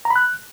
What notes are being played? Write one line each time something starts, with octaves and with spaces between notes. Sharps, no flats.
A#5
B5
F#6